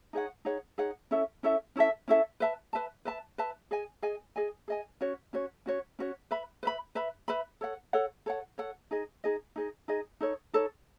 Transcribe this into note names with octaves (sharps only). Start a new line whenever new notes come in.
D#4 G#4 C#5 F#5
D#4 G#4 C#5 F#5
D#4 G#4 C#5 F#5
C#4 E4 A4 E5
C#4 E4 A4 E5
C#4 E4 A4 E5
C#4 E4 A4 E5
B4 E5 A5
B4 E5 A5
B4 E5 A5
B4 E5 A5
G#4 D#5 G#5
G#4 D#5 G#5
G#4 D#5 G#5
G#4 D#5 G#5
C#4 F#4 C#5
C#4 F#4 C#5
C#4 F#4 C#5
C#4 F#4 C#5
B4 E5 B5
B4 E5 B5
B4 E5 B5
B4 E5 B5
A4 C#5 F#5
A4 C#5 F#5
A4 C#5 F#5
A4 C#5 F#5
D#4 G#4 D#5
D#4 G#4 D#5
D#4 G#4 D#5
D#4 G#4 D#5
D#4 A4 C#5
D#4 A4 C#5